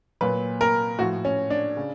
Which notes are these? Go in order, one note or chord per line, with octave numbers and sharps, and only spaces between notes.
A#2 F#3 B4
A#4
A2 F3 F#4
C#4
D4
C#3